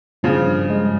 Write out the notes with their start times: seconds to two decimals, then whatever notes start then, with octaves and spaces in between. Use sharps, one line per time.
0.23 G2 C#3 F3
0.46 G2
0.70 G#3